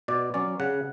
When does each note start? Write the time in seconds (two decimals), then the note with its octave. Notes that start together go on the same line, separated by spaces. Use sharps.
0.08 B2 D5
0.34 F#3 C#4 D5
0.60 C#3 F#5